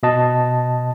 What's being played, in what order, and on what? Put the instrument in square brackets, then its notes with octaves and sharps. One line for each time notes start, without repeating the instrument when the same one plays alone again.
[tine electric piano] B2 D#5 A5